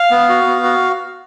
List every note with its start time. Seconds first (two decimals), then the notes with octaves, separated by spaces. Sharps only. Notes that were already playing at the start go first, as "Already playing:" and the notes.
Already playing: F5
0.11 B3
0.29 F#4
0.47 B3
0.63 F#4